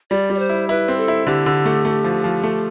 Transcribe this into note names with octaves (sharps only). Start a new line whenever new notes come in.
G3 D5
G3 D5
C5
E4
E4 B4
C4
A4
E4
D3 G4
D3
A3
A3
F3
F3
A3